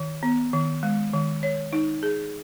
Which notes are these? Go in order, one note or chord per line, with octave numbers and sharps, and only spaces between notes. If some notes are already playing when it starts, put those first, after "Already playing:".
Already playing: D#3
B3
D#3
G#3
D#3
C#5
D#4
G#4